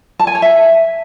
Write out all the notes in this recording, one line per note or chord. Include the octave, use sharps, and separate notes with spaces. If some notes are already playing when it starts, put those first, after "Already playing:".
A5
G#5
C#5
E5